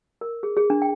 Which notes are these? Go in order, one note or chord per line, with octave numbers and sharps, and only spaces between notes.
A#4
G#4
G#4
D4
G5